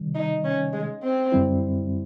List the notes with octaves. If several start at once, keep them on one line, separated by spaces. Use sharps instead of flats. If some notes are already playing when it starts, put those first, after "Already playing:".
Already playing: C3 D#3 G3
D#4
C#4
G#3
C4
F#2 D3 G3 C4 E4